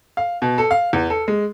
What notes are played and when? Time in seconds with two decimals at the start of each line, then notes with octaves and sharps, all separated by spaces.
0.17 F5
0.42 B2
0.58 A4
0.71 F5
0.93 E2
1.10 A4
1.28 G#3